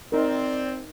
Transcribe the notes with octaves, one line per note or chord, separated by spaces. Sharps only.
C4 D#4 A#4 D5